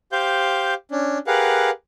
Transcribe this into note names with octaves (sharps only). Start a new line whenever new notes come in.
G4 C5 F5 G6
C#4 D4
G4 G#4 A#4 B4 F5 F#5